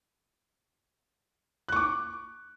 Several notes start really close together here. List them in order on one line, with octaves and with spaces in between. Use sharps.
F#6 C#6 D6